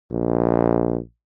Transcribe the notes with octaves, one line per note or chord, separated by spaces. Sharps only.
A#1